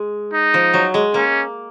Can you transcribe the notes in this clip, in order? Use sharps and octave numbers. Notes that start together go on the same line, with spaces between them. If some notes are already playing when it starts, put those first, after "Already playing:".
Already playing: G#3
D#4
F3
F#3
G#3
A#3 C#4